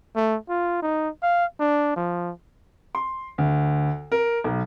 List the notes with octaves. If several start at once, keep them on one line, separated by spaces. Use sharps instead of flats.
A3
F4
D#4
F5
D4
F3
C6
D2
A#4
B1